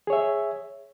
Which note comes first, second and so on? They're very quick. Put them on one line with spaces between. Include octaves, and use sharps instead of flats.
G#4 C#5 E5